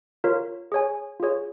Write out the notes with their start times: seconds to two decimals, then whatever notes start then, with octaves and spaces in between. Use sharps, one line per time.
0.24 F4 A#4 C#5
0.72 G#4 C#5 G#5
1.20 F4 G#4 C#5